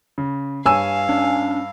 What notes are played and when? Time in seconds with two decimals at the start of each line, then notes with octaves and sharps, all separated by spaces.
0.18 C#3
0.66 G2 C#5 F5 G#5 E6 D#7
1.09 C#4 D4